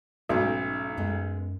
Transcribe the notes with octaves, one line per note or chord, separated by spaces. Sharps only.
B1 G#2 A3 C#4
F#2 G#3 B3